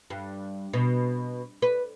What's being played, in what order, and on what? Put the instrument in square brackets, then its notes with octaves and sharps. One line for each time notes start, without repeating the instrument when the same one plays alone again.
[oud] G2
B2
B4